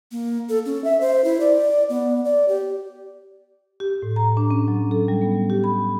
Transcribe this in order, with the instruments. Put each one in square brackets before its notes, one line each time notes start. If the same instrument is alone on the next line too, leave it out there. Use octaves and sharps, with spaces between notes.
[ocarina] A#3
A4
C#4
E5
C5
E4
D5
B3
D5
G4
[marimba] G4
A2
A#5
D4
C#4
F#3
A4
G3
B3
G4
B5